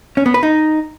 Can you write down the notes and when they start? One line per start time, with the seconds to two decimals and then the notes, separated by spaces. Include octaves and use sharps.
0.17 C#4
0.26 B3
0.34 B4
0.43 D#4